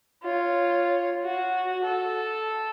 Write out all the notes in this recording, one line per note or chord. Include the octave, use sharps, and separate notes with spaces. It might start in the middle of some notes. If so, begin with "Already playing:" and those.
F4 C#5
F#4
A4